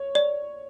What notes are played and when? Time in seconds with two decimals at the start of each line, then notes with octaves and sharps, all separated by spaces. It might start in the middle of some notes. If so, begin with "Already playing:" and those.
Already playing: C#5
0.15 D5